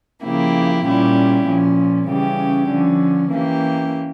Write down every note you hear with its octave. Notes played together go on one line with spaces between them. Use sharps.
C#3 F3 A#3 E4 G4
A#2 G3 C#4 E4 G4
A#2 F3 C#4
C#3 E3 G3 C#4 G4
D3 F3 C#4
E3 A#3 C#4 G4